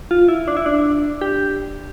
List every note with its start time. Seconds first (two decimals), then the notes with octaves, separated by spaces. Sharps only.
0.11 F4
0.28 E4
0.48 D4
0.57 E4
0.66 D4
1.21 G4